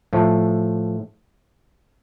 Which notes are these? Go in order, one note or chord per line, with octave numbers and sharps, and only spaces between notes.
A2 F3 A3